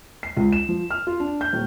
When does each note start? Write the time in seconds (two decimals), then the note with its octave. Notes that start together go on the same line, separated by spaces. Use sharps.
0.23 C7
0.37 C#2
0.52 E7
0.69 F3
0.91 F6
1.07 F4
1.20 D4
1.41 G6
1.53 D#1